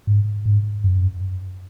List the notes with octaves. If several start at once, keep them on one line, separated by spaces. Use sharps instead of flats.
G#2
G#2
F#2